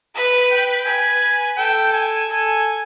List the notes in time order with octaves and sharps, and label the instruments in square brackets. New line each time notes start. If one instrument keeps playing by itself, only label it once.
[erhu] B4
[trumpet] G5
[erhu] B4 [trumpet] G#5
[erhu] A4 [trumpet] G5
[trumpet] G#5
[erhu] A4